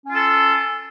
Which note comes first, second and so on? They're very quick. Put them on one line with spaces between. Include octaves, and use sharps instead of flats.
C#4 F4 A4